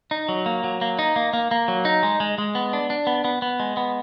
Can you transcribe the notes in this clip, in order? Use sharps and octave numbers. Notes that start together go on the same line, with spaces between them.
D#4
F#3
A#3
F#3
A#3
D#4
A#3
A#3
A#3
F#3
D#4
G#3
G#3
G#3
B3
D4
D4
B3
B3
B3
G#3
B3